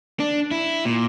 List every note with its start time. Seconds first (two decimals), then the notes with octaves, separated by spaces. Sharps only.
0.20 D4
0.51 E4
0.85 A#2